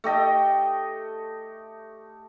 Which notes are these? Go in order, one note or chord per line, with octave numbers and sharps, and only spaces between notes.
A3 G4 D#5 G5